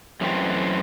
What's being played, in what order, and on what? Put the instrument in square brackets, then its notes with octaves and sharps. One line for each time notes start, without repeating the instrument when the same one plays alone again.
[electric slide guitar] F#2 E3 A3 C4